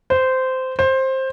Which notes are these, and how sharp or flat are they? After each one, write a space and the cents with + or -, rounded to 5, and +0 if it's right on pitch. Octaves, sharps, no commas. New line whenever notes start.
C5 -15
C5 +15